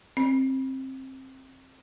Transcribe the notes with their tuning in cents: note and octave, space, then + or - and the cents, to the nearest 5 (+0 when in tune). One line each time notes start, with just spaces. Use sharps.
C4 +20